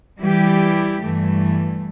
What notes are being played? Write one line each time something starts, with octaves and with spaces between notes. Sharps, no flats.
E3 G3 E4 G4
G2 E3 A3